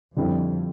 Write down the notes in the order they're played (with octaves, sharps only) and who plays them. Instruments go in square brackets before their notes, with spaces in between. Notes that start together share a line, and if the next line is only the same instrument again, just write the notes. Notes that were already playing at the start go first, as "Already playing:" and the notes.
[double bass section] F2 [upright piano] D3 G3 C4 E4